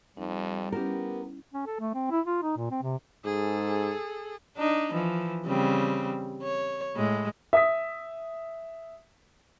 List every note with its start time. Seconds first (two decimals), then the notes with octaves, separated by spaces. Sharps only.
0.17 F2 G3 D#4
0.72 B3 C#4 E4 G4 A#4
1.53 C#4
1.66 A4
1.80 A3
1.94 C4
2.11 E4
2.26 F4
2.43 D#4
2.57 A#2
2.71 C4
2.82 C3
3.25 G#2 G#4 A4
4.57 D4 D#4
4.92 E3 F3
5.46 C#3 G3 C4
6.43 C#5
6.96 A2 G#3
7.53 E5 D#6 B6